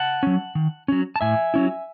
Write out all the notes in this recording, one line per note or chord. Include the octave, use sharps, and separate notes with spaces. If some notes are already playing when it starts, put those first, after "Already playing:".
Already playing: F#5 A5
F#3 C#4
D#3
F#3 C#4
A5
A2 E5 G#5
F#3 C#4 E4